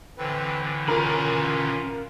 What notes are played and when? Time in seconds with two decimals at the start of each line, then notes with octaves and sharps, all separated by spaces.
0.18 A2 D3 E3 C4 B4
0.88 C#4 F4 A#4 B5